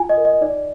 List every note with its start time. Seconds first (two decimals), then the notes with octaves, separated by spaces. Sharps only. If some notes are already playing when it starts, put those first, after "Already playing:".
Already playing: F4 G#5
0.09 D#5
0.17 A#4
0.25 D#5
0.41 D#4 D5